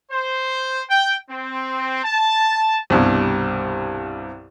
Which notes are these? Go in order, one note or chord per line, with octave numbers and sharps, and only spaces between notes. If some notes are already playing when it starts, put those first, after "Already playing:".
C5
G5
C4
A5
C2 G2 B2